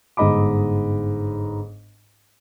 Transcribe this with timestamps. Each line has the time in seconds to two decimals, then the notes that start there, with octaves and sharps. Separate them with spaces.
0.17 G1 G#2 D#5 B5 D6